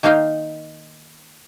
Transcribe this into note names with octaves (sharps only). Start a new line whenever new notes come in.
D#3 A#3 D#4 F5 G5